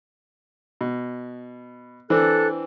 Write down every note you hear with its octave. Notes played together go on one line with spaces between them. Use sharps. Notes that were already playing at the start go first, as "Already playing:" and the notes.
B2
E3 C4 D4 A4 F#6